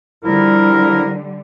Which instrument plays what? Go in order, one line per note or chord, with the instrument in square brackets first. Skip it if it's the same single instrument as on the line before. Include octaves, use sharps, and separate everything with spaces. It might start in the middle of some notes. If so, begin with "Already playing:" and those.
[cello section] D3 G3 [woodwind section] F3 E4 A#4